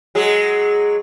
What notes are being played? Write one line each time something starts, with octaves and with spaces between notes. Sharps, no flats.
F#3 G#3 G#4